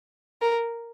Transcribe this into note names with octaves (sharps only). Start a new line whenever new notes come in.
A#4